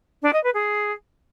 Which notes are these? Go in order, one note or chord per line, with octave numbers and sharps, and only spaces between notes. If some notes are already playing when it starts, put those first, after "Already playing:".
D4
D#5
B4
G#4